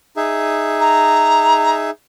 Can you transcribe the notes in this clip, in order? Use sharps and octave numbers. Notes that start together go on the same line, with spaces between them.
D#4 G#4 E5
A#5